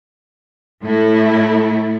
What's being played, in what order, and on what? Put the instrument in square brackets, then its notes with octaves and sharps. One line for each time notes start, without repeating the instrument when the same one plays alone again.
[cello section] A2 A3 E4